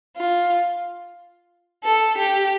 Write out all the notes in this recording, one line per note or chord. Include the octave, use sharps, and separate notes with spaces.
F4
A4
G4